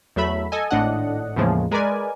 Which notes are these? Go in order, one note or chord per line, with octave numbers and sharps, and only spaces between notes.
E2 F#3 A3 E5 B5
A4 D#5 G#5
G#1 A2 D4 D#5 F#5
E2 A2 C#3 F3 G#3 A#3
G#3 A#4 B4 D5 G#5